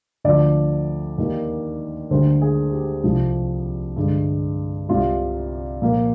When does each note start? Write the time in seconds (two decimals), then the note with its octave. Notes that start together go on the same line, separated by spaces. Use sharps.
0.24 D2 D3 F3 D5
1.18 D#2 D#3 A#3
2.10 D2 D3 G3 C5
2.42 G#4
2.73 G4
3.04 C2 C3 F3
3.96 G2 D3 G#3
4.88 C2 C3 G3 F4
5.82 A#2 F3 A#3